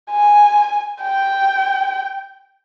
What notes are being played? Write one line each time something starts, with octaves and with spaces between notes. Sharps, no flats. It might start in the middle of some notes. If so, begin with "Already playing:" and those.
G#5
G5